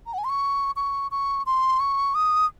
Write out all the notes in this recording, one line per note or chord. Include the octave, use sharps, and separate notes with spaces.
A#5
F#5
G#5
C6
C#6
C#6
C#6
C6
C#6
D#6